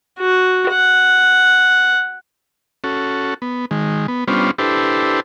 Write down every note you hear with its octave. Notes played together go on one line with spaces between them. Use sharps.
F#4
F#5
C#4 F#4 A4
B3
D#3 G#3
B3
G3 B3 C#4 D4 F4 C5
D4 E4 G4 A4 B4 C5